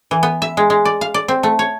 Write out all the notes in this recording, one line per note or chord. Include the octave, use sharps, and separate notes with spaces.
E3
B3
E5
G#3
G#3
D5
F5
D5
C4
A3
C#5